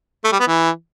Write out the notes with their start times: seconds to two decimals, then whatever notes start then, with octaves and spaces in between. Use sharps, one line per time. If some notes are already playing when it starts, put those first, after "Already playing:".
0.24 A3
0.32 G3
0.40 B3
0.47 E3